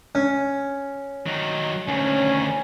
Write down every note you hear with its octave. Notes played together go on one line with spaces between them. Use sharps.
C#4
D#3 F#3
D2 D#3 C#4